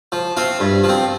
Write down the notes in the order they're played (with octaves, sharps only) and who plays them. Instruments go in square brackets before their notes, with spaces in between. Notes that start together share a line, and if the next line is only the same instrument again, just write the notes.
[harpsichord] F3
C4 F4
G2
F3
C4